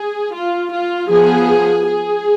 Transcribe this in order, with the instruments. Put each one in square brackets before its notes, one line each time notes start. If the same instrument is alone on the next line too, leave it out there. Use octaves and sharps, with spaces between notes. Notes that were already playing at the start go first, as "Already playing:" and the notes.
Already playing: [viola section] G#4
F4
F4
F3 B3 G#4
G#4